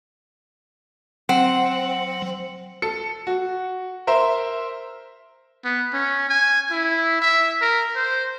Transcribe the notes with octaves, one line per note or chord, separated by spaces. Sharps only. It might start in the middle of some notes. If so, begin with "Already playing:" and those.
F#3 C4 F#5
A4 C#7
F#4
A#4 C5 E5
B3
C#4
G#5
E4
E5
A#4
C5